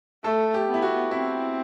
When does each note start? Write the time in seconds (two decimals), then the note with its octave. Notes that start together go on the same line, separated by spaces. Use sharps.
0.24 A3 A4
0.54 G4
0.68 B3
0.74 E4
0.82 F#4
1.11 C4 E4